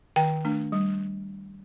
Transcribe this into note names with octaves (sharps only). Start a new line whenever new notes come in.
D#3 G5
A3 D4
G3